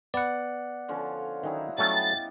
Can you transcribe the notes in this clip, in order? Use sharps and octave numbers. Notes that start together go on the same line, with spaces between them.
B3 D5 F#5
D3 F3 C#4
D#3 F#3 C#4 D#4 E4
F#3 G3 A3 B3 C#4 G5 A6